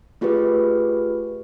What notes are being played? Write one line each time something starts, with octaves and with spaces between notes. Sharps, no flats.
A3 F4 G4 G#4 B4